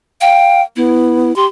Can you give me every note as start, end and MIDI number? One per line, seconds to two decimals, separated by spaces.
0.21 0.62 77
0.21 0.62 79
0.77 1.34 59
0.77 1.36 64
1.36 1.47 67
1.36 1.45 84